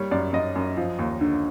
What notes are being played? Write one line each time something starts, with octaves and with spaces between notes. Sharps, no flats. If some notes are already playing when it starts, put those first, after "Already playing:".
Already playing: G3 A#3 C#5
F#2 D5
F#2 D#5
F#2
F3
D#2
D3